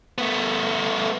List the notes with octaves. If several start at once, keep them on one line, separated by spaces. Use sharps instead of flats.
A3 B3